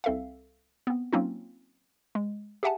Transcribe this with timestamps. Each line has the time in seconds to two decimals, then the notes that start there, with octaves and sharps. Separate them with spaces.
0.04 C2 C4 A4 E5 F5
0.87 B3 C4
1.13 F#3 A#3 C4 C#4 D#4 F4
2.15 G#3
2.63 G4 G#4 E5 F#5 G#5 A5